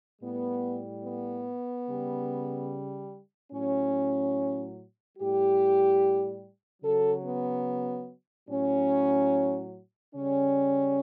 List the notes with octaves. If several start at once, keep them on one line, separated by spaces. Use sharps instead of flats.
A2 G3 B3
B3
C#3 G3
A2 F#3 C#4
A2 G3 G4
C#3 F#3 A4
B3
A2 F#3 C#4
C#3 G3 C#4